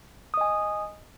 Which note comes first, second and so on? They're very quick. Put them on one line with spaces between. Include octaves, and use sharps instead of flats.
D#6 D#5 G#5